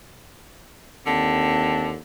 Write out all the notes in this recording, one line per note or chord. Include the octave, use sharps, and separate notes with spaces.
D#2 D3 C4 A5